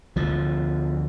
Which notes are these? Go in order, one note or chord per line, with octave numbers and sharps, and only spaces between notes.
D2 D3 F3